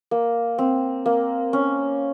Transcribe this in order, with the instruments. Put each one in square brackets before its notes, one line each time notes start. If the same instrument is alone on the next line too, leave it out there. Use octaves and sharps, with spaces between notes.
[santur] A#3
C4
A#3
C#4